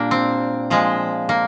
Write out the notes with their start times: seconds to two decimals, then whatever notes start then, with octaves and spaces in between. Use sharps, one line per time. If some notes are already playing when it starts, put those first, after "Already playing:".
Already playing: A#2 G3 A#3 D4
0.11 C4
0.70 A#2 F3 G#3
1.29 A#3